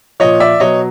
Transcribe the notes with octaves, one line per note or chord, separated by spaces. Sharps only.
A#2 F3 C#5 D#5
D5 E5
B2 F#3 C#5 D#5